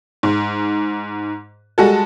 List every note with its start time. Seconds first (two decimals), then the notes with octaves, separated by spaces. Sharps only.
0.23 G#2
1.78 G3 G#3 F#4 A4